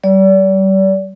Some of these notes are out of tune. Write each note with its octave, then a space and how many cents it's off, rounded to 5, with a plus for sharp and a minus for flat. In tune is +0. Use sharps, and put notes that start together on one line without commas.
G3 -30 D5 -35